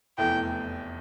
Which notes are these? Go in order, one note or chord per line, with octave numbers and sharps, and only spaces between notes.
F1 E2 E3 A3 G5